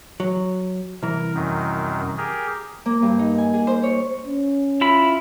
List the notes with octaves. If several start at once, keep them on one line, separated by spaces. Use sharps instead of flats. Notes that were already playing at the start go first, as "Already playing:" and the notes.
F#3
C2 E3 A#4
F#2 D#3
G4 G#4 A#4
A#3
G2
D#4
G#5
G#4
C5
C#5
C#4
E4 F4 B5